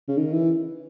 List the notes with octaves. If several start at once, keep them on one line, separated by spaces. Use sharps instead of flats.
C#3
D#3
E3